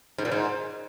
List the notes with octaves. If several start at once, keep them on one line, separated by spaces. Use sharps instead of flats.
G#2
A#2
G#2